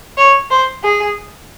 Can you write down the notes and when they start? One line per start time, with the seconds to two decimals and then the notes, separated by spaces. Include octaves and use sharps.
0.17 C#5
0.51 C5
0.83 G#4